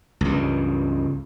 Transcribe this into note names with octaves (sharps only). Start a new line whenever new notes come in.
C#2 G2